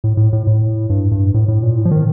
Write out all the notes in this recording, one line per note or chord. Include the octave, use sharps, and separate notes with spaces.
A2
A2
A2
A2
G2
G2
A2
A2
A#2
A2
F3
D#3